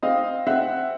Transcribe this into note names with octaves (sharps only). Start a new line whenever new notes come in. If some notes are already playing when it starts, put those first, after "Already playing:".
C4 D#5 F5
C4 E5 F#5